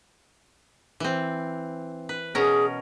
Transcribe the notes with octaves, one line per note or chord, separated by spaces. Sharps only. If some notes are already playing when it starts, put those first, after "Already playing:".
E3 C4
B4
B2 C#4 G#4 A#4